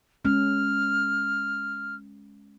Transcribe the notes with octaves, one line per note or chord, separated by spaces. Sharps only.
G#3 C#4 F6